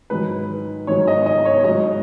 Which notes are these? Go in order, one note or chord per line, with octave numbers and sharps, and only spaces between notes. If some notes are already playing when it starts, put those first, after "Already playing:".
G#2 D#3 F#3 B4
G#2 D#3 F#3 C#5
D#5
D#5
C#5
G#2 F#3 D#5